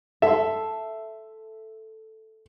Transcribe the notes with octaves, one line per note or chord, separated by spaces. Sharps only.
A4 E5 C6